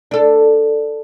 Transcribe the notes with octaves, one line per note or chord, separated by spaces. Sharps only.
D4 A4